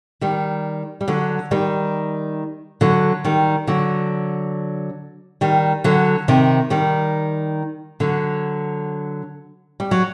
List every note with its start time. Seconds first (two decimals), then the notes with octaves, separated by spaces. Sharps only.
0.21 D#3 G3
1.01 G3
1.08 D3 F#3
1.51 D#3 G3
2.81 D3 F#3
3.25 D#3 G3
3.67 D3 F#3
5.41 D#3 G3
5.84 D3 F#3
6.28 C3 D#3
6.70 D#3 G3
8.00 D3 F#3
9.80 G3
9.91 F#3